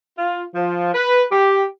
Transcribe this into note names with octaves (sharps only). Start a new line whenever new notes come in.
F4
F3
B4
G4